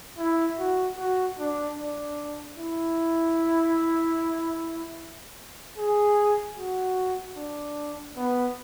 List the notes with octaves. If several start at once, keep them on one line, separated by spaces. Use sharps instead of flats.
E4
F#4
F#4
D4
D4
E4
G#4
F#4
D4
B3